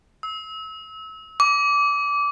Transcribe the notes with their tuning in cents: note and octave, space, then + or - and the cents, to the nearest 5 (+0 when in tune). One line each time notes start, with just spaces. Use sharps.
E6 -30
D6 -20